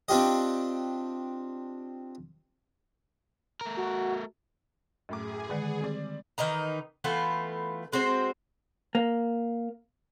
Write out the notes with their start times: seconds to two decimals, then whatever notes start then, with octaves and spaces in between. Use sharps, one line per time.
0.08 C4 D4 F4 G4 D#5
3.61 A3 A#4
3.77 F#4
5.09 F#2 A2 G#4 D6
5.49 D3 D#3 G#3 B4 D5 F#5
5.81 G3 C4 D5
6.38 D#3 E3 D#4 A#5
7.04 E3 A3 B3 F4
7.92 G#3 C4 F#4 C5
8.95 A#3